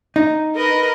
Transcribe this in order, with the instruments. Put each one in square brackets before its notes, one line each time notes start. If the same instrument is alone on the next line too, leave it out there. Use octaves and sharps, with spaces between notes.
[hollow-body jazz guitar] D#4
[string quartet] A#4 B4 D#5